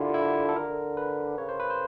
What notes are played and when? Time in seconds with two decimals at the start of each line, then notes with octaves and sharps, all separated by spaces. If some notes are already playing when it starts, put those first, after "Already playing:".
Already playing: D3 E4 F4 G4 A#4
0.14 E4
0.49 A4
0.56 D3 A#4
0.97 B4
1.38 C#3 C#5
1.49 C5
1.60 B4
1.70 C5